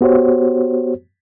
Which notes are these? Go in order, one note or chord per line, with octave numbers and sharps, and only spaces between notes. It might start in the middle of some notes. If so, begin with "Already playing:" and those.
B3 F#4 G4 C5 C#5